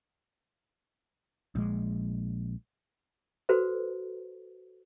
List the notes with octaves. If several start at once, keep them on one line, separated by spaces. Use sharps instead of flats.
A#1 G#3
F#4 A4 B4 C5